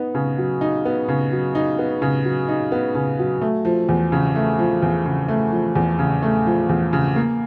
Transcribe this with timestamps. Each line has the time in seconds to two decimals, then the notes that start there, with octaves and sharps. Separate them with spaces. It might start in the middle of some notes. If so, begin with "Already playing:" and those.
Already playing: B3 D#4
0.15 C#3
0.38 F#3
0.61 D#4
0.85 B3
1.08 C#3
1.32 F#3
1.55 D#4
1.79 B3
2.02 C#3
2.25 F#3
2.49 D#4
2.72 B3
2.95 C#3
3.19 F#3
3.41 A3
3.65 F3
3.89 E2
4.12 C#3
4.36 A3
4.59 F3
4.82 E2
5.06 C#3
5.28 A3
5.52 F3
5.75 E2
5.99 C#3
6.22 A3
6.46 F3
6.69 E2
6.93 C#3
7.16 A#3